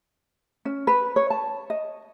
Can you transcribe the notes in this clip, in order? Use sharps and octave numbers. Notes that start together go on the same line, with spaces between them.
C#4
B4
C#5
A5
D#5